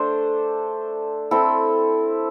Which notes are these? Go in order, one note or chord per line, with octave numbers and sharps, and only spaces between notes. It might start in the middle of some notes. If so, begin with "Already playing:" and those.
Already playing: A3 D4 A4 C5
C4 E4 A4